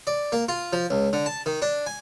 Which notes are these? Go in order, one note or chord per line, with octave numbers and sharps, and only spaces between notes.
D5
A#3
F4
F3
C#2
D3
A5
D#3
D4
G#5